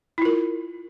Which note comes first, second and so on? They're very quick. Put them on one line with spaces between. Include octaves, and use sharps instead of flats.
E4 F4 A#4